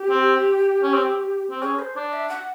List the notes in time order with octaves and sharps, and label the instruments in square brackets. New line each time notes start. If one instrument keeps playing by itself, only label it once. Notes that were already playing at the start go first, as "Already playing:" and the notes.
Already playing: [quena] G4
[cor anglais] C4
C#4
C4
C4
[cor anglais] C#4 [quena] G#4
[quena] C5
[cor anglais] D4 [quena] D5
[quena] E5
F#5